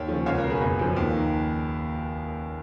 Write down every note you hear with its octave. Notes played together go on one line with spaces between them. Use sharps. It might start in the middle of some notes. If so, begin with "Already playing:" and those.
Already playing: D#2 C#5
C#3 F3
C#2 C#5 F5
A#4 C#5
B2
G#4 B4
F#1
F#2 F3
D#2
D#3